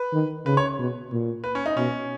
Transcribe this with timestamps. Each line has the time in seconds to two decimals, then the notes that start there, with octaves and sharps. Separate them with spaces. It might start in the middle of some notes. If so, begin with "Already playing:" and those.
Already playing: B4
0.13 D#3
0.46 C#3 B4
0.57 C#5
0.79 B2
1.12 A#2
1.44 B4
1.55 C#4
1.66 D#4
1.77 B2 C#4